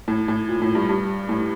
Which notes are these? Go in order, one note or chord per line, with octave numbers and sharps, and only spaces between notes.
A2
A2
A#2
A2
G2
G2
A2